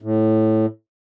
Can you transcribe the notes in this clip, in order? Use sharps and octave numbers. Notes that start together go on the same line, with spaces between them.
A2